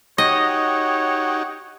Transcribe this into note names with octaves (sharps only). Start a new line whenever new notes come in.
D#4 F#4 G4 C#5 D#5